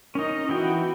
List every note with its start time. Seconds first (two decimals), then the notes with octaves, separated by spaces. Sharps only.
0.15 C#4 D#4 A#4 D#5
0.49 E3 B3 F#4 G5